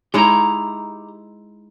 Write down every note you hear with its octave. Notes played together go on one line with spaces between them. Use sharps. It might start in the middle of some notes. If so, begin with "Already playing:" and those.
G#3 D#4 E4 G4 A#5